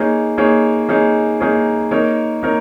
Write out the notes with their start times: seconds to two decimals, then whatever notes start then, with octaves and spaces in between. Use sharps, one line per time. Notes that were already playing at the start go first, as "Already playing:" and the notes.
Already playing: A#3 D#4 G#4 C#5
0.38 A#3 D#4 G#4 C#5
0.89 A#3 D#4 G#4 C#5
1.40 A#3 D#4 G#4 C#5
1.91 A#3 D#4 A#4 C#5
2.43 A#3 D#4 A#4 C#5